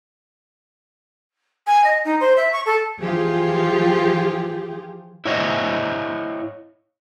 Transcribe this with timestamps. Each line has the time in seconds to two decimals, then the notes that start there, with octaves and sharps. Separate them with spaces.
1.66 G#5
1.84 D#5
2.04 D#4
2.20 C5
2.36 E5
2.52 C#6
2.65 A4
3.01 E3 F3 F4 G4 G#4
5.25 E4 C5 C#5 D#5 F5